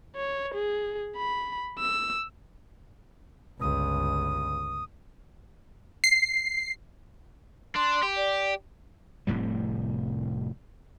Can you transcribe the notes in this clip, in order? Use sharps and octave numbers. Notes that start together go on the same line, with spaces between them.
C#5
G#4
B5
E6
G1 C#2 D#6
C7
D4 C6
G4
D5
F1 A2 C3 G3